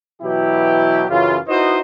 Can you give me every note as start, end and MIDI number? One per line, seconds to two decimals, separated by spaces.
0.22 1.05 47
0.22 1.05 52
0.22 1.05 54
0.22 1.05 64
0.22 1.05 67
1.10 1.38 42
1.10 1.38 49
1.10 1.38 52
1.10 1.38 65
1.48 1.79 63
1.48 1.79 64
1.48 1.79 66
1.48 1.79 71
1.48 1.79 72
1.48 1.79 75